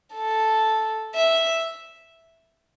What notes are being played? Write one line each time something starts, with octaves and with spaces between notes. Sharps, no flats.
A4
E5